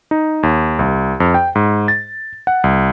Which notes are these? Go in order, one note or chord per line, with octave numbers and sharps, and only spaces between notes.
D#4
D#2
C2
F2
G5
G#2
A6
F#5
C2